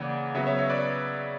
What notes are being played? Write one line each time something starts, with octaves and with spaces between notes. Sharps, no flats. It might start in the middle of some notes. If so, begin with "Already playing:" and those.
Already playing: C#3 E3 A#3 D5 F#5
C#3 F#3 B3 C#5 E5
C#5 E5
C#5 E5
B4 D5